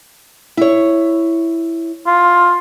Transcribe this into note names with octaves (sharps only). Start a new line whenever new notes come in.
E4 C#5
F4